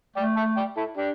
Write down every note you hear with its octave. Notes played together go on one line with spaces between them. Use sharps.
A3 D5 G5
E5 A5
D5 G5
E4 A4
D4 G4